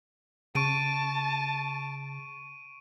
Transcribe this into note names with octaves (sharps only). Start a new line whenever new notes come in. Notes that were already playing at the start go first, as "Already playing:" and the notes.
C#3 A5 C#6 D7 D#7